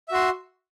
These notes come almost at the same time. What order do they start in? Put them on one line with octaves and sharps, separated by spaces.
E5 F#4 C6